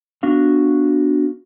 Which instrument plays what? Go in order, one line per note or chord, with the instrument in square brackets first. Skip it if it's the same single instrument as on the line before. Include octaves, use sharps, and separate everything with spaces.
[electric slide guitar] B3 D4 F#4 F5